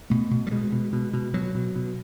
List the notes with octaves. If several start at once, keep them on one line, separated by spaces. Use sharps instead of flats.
B2 A3
B2
G3
B2 G#3
B2
B2
B2
B2 F#3
B2
B2